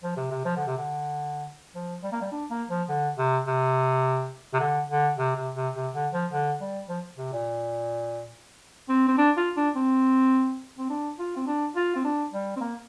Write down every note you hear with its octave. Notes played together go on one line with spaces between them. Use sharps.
F3
C3
C3
F3
D3
C3
D3
F3
G3
A#3
G3
D4
A#3
F3
D3
C3
C3
C3
D3
D3
C3
C3
C3
C3
D3
F3
D3
G3
F3
C3
A#2
C4
C4
D4
F4
D4
C4
C4
D4
F4
C4
D4
F4
C4
D4
G3
C4
A#3